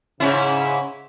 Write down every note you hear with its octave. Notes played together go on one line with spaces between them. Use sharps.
G#2 C#3 C#4 E4